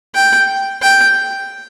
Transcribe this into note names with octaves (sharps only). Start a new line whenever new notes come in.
G5
G5